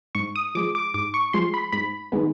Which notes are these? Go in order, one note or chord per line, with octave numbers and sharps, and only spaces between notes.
G#2 C#6
D#6
F3 G#3 D6
D6
G#2 D6
C#6
F3 G#3 C6
B5
G#2 B5
D#3 G#3 B3